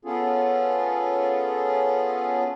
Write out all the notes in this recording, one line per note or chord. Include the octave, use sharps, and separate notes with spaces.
B3 C#4 F4 G#4 A4